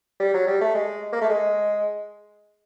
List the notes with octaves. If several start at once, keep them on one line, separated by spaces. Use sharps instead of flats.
G3
F#3
G3
A3
G#3
A#3
A3
G#3